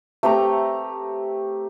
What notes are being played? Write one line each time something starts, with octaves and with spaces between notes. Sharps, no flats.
A3 C4 G4 A#5